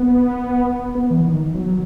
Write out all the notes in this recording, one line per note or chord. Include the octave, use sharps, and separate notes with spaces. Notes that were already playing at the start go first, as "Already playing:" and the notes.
Already playing: B3
B3
E3
D#3
F#3